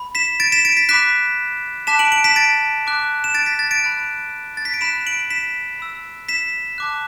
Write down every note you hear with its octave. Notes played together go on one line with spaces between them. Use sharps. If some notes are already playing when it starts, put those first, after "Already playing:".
Already playing: B5
B6 E7
A6 D7
B6 E7
A6 D7
B6
B5 D6 F#6 B6 E7
A5 D6 F#6 B6 E7
D7 F#7
D7 F#7
B6 E7
A6 D7
A5 D6 F#6
E7
A6 D7
B6
A6
A6 D7
B5 F#6
A6
B6
D7
B5 F#6 B6 E7
D7 F#7
B6 E7
B5 E6
B6 E7
A5 D6 F#6